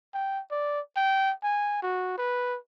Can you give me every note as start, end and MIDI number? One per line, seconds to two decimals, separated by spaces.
0.14 0.41 79
0.51 0.80 74
0.96 1.32 79
1.43 1.78 80
1.83 2.15 66
2.18 2.57 71